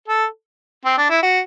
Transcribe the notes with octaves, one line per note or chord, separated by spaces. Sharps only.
A4
C4
D4
E4
F#4